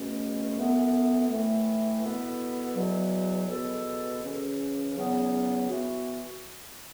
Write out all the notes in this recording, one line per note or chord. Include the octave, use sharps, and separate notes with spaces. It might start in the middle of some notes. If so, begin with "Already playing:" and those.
Already playing: C#2 B2 A3 C#4
F#2 E3 B3 A4
A2 E3 A3
B2 B3 E4 A4
E2 B2 F#3
C#2 B2 B3 A4
C#2 C#3 E3 C#4
E2 C#3 F#3 B3
E3 B3 F#4